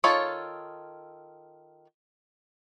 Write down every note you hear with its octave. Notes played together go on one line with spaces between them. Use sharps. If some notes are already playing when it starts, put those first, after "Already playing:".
D#3 F4 A4 C#5 B5